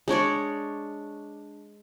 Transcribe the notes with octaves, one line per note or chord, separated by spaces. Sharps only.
G#3 D4 C#5 D5